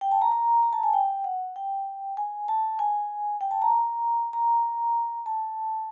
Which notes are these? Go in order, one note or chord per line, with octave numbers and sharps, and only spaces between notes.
G5
A5
A#5
A#5
A#5
A5
G#5
G5
F#5
G5
G#5
A5
G#5
G5
A5
A#5
A#5
A5